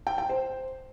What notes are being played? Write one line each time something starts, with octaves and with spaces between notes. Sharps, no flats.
G5
G5
C5